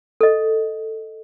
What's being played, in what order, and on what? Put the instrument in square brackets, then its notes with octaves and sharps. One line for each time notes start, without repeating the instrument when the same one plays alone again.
[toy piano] A4 D#5